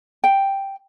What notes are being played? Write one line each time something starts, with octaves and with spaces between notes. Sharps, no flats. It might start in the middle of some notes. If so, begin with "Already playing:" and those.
G5